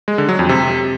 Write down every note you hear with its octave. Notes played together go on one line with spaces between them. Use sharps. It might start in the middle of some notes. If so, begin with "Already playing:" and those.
G#3
D3
F#3
F2
C3